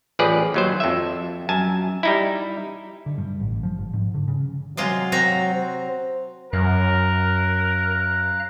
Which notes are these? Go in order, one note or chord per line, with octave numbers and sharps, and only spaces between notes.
A1 F3 G#4 B4 D5
D#2 F#3 C5
F2 E5
F#2 G#5 A5
G3 D#4 E4
D3
G2
A1
F3
G1
G#2
D3
C#3
C3 F#3 G#3 F4
C4 F#4 A#5
C5
F#2 A#4 F5 A#5 F#6